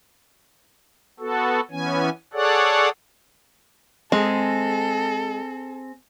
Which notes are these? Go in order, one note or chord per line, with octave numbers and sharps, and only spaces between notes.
B3 F#4 A4
E3 B3 C#4 G#5
G#4 A4 C#5 D5 F#5
G#3 C4 G#4 A4